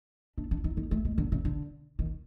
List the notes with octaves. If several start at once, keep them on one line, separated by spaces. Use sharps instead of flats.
D4
D4
D#4
D#4
A3
G#3
D3
C#3
D3
D#3